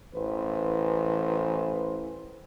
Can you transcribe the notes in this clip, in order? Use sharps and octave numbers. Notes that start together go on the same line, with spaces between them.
A1 E3 B4 C5